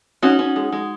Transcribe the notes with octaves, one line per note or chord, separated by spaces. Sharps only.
C#4 D#4 F#4
C#4
G#3
G#3